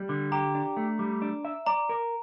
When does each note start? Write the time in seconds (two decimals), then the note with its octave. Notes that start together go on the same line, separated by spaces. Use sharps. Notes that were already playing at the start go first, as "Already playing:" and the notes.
Already playing: G3
0.09 D3
0.32 G4 A#5
0.55 D4
0.77 A3
0.99 G3
1.22 D4
1.45 E5
1.66 D5 A#5
1.89 A#4